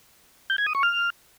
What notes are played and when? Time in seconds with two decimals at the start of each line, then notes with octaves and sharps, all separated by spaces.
0.50 G6
0.58 G#6
0.66 D#6
0.75 C#6
0.83 F6